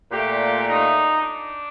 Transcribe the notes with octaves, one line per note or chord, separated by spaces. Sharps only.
A#2 A3 G4
D#4
D4